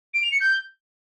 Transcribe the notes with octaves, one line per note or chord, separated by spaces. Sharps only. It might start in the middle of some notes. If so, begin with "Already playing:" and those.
D7
F7
C#7
G6